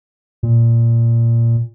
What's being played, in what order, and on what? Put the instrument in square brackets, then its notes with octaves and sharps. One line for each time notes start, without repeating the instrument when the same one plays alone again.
[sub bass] A#2